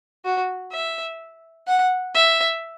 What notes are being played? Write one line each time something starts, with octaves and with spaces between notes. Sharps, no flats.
F#4
E5
F#5
E5